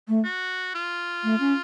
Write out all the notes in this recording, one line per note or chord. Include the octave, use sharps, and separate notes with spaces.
A3
F#4
F4
A3
C#4